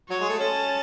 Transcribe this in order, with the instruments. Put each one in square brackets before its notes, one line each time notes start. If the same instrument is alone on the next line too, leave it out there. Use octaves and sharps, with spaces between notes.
[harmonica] F#3 [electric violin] C#5
[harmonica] G#3
A3
[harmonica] C#4 [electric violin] A5